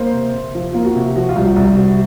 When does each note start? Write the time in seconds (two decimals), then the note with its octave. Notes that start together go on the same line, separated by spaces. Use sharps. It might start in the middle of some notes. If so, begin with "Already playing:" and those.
Already playing: A#3 C5
0.13 C3
0.34 C3
0.55 F3 F4
0.73 A#3 F4
0.85 F#4
0.95 C3
1.16 F3 F#4
1.29 F4
1.36 C2
1.43 F#4
1.56 C2
1.77 C3 F#4